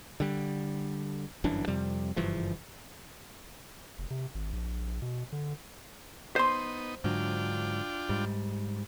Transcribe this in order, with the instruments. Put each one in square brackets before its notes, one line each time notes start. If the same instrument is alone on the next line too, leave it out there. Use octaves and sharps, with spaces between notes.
[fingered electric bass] D3 G3
G1 F#2 E3 D4
F2 C3 G3
F#1 G2 E3 F3
[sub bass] F1
C3
G#1
A#1
B2
D3
[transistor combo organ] B3 D#4 [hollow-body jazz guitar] C5 C6
[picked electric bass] G#2 D3 F#3 [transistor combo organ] D4 F4 G5
[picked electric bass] G#2 G3